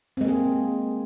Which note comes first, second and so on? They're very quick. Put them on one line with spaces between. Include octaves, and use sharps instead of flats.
C4 G#3 A#3 G#4